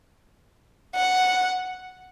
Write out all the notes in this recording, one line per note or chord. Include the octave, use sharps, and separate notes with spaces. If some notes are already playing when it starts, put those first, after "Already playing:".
F#5